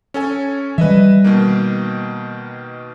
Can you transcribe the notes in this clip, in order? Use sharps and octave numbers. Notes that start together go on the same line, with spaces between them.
C#4 A4 G#5
E3 G3 B4 D#5 E5
B2 D#3 A#3